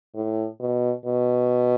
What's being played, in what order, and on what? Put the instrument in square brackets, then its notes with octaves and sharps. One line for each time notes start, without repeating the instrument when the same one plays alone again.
[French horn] A2
B2
B2